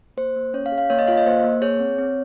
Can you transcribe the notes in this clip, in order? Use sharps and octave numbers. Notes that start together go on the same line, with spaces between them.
A#3 C5
A#3
C#4 C#5
F5
G#4
F5
A#3 C#5
D#5
F4 F5
D#5
A#3 C5
A#3
G#4 C#5
C4
C4